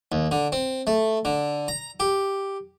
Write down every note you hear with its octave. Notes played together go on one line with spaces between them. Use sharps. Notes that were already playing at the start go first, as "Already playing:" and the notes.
D#2
D3
C4
A3
D3
A#5
G4